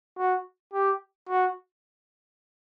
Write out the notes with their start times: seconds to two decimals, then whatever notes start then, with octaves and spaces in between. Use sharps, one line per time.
0.18 F#4
0.73 G4
1.29 F#4